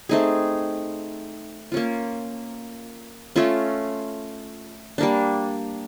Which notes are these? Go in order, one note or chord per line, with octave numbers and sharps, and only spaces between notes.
A3 C4 D#4 G#4
A#3 C#4 F4
A3 C#4 F4
G3 A#3 D4